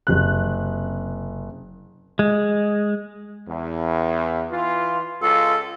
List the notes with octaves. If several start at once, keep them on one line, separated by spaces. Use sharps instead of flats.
F#1 C3 F#6
G#3
E2
E3 F4
C#2 F4 A4